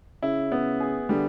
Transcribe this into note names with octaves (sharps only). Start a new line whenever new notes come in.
C#3 E4
B3
G#4
D3 G3